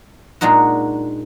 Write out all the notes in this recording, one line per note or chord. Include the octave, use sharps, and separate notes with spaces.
A#2 G#3 D4 D#4 F#4